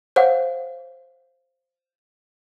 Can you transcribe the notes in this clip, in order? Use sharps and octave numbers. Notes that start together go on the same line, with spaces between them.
C5 C#5 F5 F#5